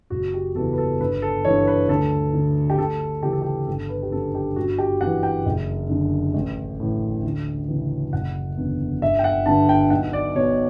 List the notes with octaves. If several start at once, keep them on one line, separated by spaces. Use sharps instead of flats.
F#1 F#4
G4
E2 C#3 E3 A4
B4
A4
G1 B4
A4
G2 E3 C#5
B4
D2 A4
D3
G4
D2 A4
C#3 E3 G4
A4
G4
G1 A4
B4
G4
F#2 D3 A4
G4
G1 F#4
G4
F#2 E3 F#5
G5
F#1
F#2 D3
A1
A2 E3
D2
C#3 E3
F#1 F#5
E2 D3
G1 E5
G5
F#5
G2 D3 A5
G5
B1 F#5
D5
B2 C#5